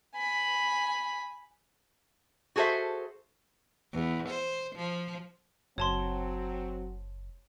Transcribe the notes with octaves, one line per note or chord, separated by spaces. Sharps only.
G#5 B5
F#4 G#4 A4 C5 E5
E2
C5
F3
F#1 F#3 C4 C#5 A5 C6